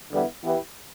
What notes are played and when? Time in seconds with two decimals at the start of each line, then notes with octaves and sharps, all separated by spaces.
0.10 E2 D3 G3 B3 E4
0.44 E3 B3 E4 G4 B4